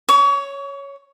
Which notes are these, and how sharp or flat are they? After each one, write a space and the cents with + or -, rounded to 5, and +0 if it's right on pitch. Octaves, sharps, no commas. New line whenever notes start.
C#5 +5 C#6 +35